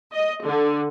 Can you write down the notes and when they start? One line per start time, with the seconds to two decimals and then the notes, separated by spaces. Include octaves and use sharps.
0.12 D#5
0.45 D3